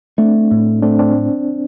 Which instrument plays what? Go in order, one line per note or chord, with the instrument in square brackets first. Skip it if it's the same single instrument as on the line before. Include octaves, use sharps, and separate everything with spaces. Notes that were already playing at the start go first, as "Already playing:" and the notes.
[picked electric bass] A3 [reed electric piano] C4 D4
[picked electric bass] A2
[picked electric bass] A3 [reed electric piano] C4 D4
[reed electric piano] C4 D4